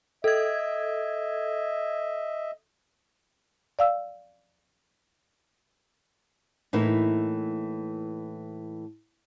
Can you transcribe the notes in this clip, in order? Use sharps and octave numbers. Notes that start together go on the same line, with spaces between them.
A4 D#5 E5 G#6
D5 F5 E6
A2 E3 A#3 D#4 E4